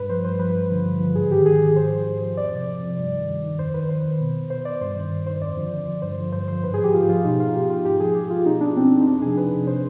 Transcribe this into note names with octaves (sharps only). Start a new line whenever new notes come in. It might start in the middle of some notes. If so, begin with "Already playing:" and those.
Already playing: G2 B4
F3 C5
G2 C5
F3 B4
G2
D3 F3
G2
D3 F3
G#2 G#4
D#3 G4
G#2 G#4
D#3
G#2 C5
F3
G#2
F3
F2 D5
C3 F3
F2
C3 F3
G2
D#3
G2
D#3
F2 C5
D#3 B4
F2 C5
D#3
B2
B2 C5
D5
G2 C5
D#3
G2
D#3 C5
F2 D5
D3 F3
F2
D3 F3
G2 C5
D3 F3
G2 C5
D3 F3 C5
G#2 B4
G#4
F3 G4
G#2 F4
F3 F4
B2 D#4
F4
B2 G4
F4
G#2 G4
F3 G#4
G#2 G4
F3 F4
B2 D#4
D4
B2 C4
D#4
F2 D4
C3 F3 G#4
F2 B4
C3 F3
C5